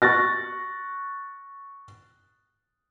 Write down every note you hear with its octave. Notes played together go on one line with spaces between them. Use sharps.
C#6 F#6 A6 A#6